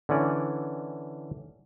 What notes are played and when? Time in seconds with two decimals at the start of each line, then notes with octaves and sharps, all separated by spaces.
0.09 D3 E3 C#4 D5